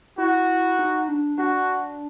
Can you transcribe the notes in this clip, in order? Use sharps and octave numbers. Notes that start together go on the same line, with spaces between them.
E4 F#4
D#4
D4
D4 F#4